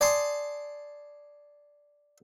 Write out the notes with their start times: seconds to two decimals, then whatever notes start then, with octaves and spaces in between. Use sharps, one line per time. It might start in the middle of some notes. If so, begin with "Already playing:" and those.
0.01 D5 G#5 A5 C6 D#6